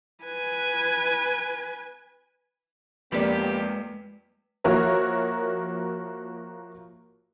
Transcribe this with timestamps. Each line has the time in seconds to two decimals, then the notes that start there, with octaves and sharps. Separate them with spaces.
0.24 B4 G#5
3.12 F2 F3 G#3 A#3 B3 G4 B4 D5
4.64 F3 A#3 F#4 A#4 C#5 E5